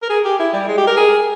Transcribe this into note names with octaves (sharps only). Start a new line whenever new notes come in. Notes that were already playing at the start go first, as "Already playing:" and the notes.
A#4
G#4
G4
E4
G3
G#3
G4
A#4
G#4